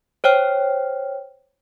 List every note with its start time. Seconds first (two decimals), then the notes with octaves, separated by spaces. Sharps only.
0.24 C5 C#5 G5 F6